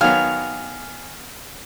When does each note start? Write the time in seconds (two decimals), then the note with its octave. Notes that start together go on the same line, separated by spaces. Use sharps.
0.01 D#3 F#3 B3 F5 G#5 F6